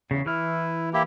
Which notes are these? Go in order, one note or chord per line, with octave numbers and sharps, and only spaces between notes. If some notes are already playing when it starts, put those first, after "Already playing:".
E2 C#3
E3 E4 F6
A#3 E4 G4